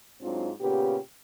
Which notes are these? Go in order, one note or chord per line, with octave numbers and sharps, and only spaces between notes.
G#2 F#3 C4 D4 F4
A#2 C#3 B3 G4